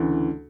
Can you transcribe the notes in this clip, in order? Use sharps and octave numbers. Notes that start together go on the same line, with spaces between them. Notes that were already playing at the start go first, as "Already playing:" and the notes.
Already playing: D2 C#3 E3